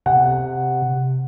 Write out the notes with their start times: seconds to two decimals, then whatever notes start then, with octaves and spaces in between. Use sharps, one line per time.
0.06 C3 F#5